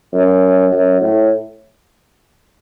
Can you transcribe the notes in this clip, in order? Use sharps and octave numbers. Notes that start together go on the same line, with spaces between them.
F#2
F#2
A2